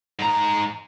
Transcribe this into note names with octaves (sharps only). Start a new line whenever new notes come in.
G#2 A#5